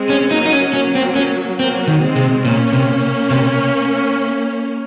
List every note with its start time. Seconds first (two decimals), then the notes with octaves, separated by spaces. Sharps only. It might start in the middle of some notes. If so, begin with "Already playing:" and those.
Already playing: G#3 C4
0.10 C#4
0.30 F#3 A#3 D#4
0.46 D#4
0.52 C#4
0.73 F#3 A#3 C#4
0.95 C4
1.16 C#4
1.58 F#3 A#3 C4
1.88 D#3
2.01 G#3 C4
2.16 C3
2.44 A#2 A#3 C#4
2.73 C3
3.30 C3